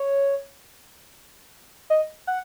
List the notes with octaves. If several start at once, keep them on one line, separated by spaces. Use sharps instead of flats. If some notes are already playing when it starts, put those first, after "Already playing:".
Already playing: C#5
D#5
F#5